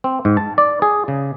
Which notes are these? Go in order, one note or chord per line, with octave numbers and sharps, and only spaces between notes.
C4
G#2
A5
D5
G#4
C#3